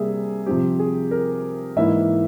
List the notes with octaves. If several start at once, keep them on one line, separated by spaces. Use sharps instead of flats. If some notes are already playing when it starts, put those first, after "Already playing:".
Already playing: C3 G3 A#3 G#4 E5
C3 F3 C4 G4
G#4
A#4
G#2 E3 A#3 E4 E5